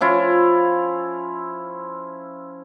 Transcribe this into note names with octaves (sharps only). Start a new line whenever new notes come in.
F3 C#4 E4 F4